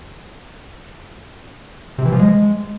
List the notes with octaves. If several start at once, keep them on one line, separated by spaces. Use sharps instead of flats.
C3
E3
F3
G#3